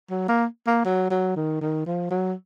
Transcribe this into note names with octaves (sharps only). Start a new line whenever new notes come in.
F#3
A#3
A#3
F#3
F#3
D#3
D#3
F3
F#3